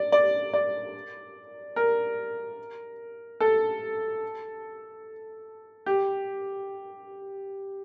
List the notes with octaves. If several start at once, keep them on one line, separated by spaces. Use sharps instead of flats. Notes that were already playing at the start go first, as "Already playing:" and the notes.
Already playing: D5
D5
D5
A#4
A4
G4